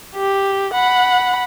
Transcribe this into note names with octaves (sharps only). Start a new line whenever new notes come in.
G4
F#5 B5